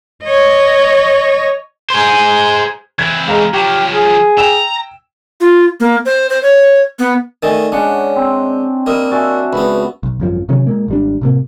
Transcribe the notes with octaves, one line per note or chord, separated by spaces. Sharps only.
C#5 D#5
G#4 C5
E3 C4 G#6
G#3 F5 A#5
F3 F#3 G4
G#4
G5 A#5 E6 E7
F4
A#3
C5
C5
C#5
B3
D#3 A3 D5 D#5 G#5
G#3 C#4 D4 D5 F#5
C4
G3 A#3 D#5 D#6 E6
F#4 D5 E5 G#5
C#2 B3 B5
B1
G#1 F#2 F3
C3 D#3 F#3 C#4
A#2 G#3 A#3
G#1 G3 D4
A2 C3 A#3